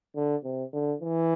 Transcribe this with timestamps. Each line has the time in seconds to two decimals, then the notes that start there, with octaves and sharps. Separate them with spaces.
0.16 D3
0.44 C3
0.73 D3
1.01 E3